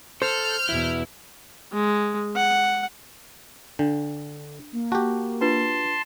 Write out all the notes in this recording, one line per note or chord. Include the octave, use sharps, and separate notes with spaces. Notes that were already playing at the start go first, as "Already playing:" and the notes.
A4 C5 F6 G6
E2 B2 E4
G#3
F#5
D3 D4
A#3
F#4 G4 A5
D4 F4 B4 A5 C6